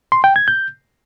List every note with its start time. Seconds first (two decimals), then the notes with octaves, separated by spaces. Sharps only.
0.12 C6
0.24 G5
0.36 G#6
0.48 G6